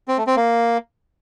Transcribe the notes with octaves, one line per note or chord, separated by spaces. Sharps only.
C4
A3
C4
A#3